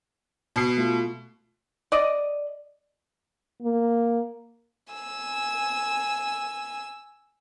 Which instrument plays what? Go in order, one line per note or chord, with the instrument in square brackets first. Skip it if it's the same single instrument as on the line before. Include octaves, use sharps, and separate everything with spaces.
[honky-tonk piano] B2 C7
[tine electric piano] A3 F4
[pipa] D5 D#5
[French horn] A#3
[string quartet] G#5 E6